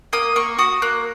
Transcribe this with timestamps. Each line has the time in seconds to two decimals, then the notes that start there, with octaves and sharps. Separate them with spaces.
0.13 A#3 D#6
0.36 A#3 C#6
0.58 F#4 D#6
0.82 A#3 F#6